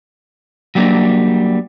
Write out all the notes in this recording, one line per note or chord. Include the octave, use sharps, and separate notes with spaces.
F#3 G3 A#3 D4